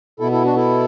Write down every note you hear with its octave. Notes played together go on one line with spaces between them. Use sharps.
B2 B3 E4 A4
E4 A4
D4 F#4
E4 A4